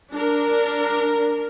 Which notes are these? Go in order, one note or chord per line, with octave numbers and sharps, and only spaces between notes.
D4 A#4